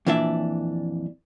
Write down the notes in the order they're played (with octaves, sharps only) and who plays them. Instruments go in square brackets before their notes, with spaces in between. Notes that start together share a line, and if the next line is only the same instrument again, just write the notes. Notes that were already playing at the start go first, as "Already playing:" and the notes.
[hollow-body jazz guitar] F2 A#2 E3 D4 D5 E5